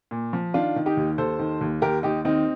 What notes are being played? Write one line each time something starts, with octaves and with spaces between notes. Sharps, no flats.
A#2
F3
D#3 D4 F4
D#3
D#4 G4
D#2
D#2 A4 C5
D#3
D#2
D#2 G4 A#4
D#2 D#4 G4
D#3 C4 D#4